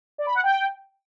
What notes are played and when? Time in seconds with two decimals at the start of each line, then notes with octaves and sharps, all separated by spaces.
0.18 D5
0.27 B5
0.35 F#5
0.43 G5